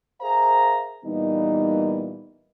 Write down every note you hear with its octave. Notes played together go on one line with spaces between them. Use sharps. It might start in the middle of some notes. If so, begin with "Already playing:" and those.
G#4 A#4 C5 E5 F5 A#5
A#2 E3 G3 A#3 B3 D#4